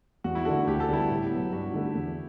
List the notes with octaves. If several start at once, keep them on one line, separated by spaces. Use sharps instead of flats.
E2 F#4
E4
D3 A3 D4 F#4 A4
D2 G4
A4
D3 G3 B3 E4 G4
A2
F#3 B3
G2 F#4
D3 A3 D4 A4
E2